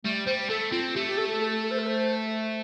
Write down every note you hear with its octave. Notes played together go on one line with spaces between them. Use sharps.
G3 A3
G3 C5
A3 A4
C4 F4
A3 G4
G4
A4
A4
A4
C5
A4
C5